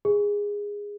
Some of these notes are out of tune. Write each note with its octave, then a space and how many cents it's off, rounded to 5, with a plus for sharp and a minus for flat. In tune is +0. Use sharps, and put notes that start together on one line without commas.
G#4 -15